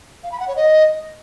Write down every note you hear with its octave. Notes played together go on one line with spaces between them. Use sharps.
F5
B5
F#5
C#5
D#5